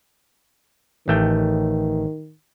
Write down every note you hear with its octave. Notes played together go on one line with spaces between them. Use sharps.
A1 D#3 A3 G5